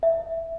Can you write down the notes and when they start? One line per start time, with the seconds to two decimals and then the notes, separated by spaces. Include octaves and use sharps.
0.03 E5